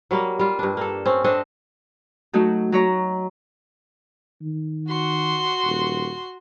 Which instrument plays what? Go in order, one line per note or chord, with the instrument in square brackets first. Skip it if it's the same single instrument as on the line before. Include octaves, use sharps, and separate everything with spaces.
[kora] F#3 G3 A#3
G3 F4
G2 D4
A#3 A4
C4 C#4
C4 D4 A4 D#5
[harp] F#3 A3 D#4 F#4
F#3 C#5 A#5
[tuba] D#3
[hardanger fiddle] F#4 C6
[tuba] D#1